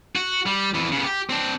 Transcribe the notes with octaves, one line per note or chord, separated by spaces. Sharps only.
F#4
G3
F2 E3
C#3 B3
G4
C4 D4